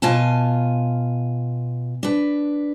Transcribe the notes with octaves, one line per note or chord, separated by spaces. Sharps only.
B2 F4 F5 G#5 A5
D4 B4